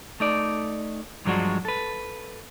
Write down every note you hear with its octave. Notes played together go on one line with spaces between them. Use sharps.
A3 D#4 D5
G2 F3 F#3 G#3 D4 F#4
A4 B4